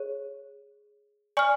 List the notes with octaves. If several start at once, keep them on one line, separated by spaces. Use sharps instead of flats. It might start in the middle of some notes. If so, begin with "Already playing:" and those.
Already playing: G#4 C#5
D5 G#5 C#6 F6